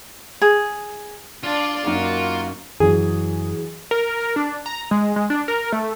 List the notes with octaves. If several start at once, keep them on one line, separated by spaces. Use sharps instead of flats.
G#4
D4 F4 D5 F5
F#2 A#3 D#4 F#4 D6
F#2 E3 F#3 G#4
A#4
D4
A#5
G#3
G#3
D4
A#4
A3